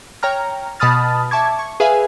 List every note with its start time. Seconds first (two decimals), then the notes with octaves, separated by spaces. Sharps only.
0.23 C#5 G5 A#5 F6
0.79 B2 A5 B5 D#6 F6 A6
1.31 E5 A5 C#6 D6 G#6
1.59 C#6
1.80 G#4 B4 E5 F5 G#5